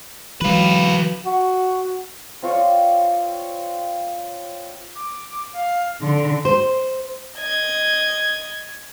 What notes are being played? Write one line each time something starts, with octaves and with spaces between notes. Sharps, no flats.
E3 F#3 F4 B4
F#4
C4 F4 C#5 D5
D6
F5
D3 C6
C5
D#5 G#6